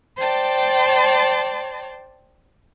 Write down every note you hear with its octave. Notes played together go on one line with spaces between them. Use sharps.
C5 D5 G5 A5